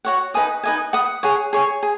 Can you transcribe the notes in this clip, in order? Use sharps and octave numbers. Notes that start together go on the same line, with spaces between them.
F#4 C#5 F#5
D#4 B4 G#5 D#6
D#4 B4 D#5 G#5
B4 F#5 D#6
G#4 C#5 F#5
G#4 C#5 G#5
G#4